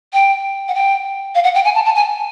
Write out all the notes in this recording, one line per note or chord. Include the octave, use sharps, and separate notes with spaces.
G5
F#5
G5
F5
F#5
G5
G#5
A5
A5
G#5